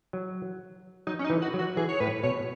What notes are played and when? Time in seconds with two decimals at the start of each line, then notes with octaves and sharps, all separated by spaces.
0.13 F#3
1.07 F#3 D#4
1.19 C#4
1.24 D#4
1.30 E3
1.42 F#4
1.54 F#3
1.59 F#4
1.77 E3 G#4
1.89 C#5
2.00 A2 B4
2.23 B2 C#5